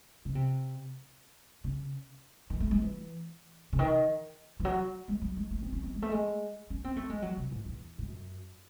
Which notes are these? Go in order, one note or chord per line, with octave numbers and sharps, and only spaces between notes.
C#3
C3
C#3
D#3
A3
G#3
E3
C#3
D#3
E3
F#3
G#3
F#3
G#3
A3
C4
C#4
C4
G#3
A3
G#3
C#4
C4
A3
G#3
F#3
C3
A2
E2
G#2
F#2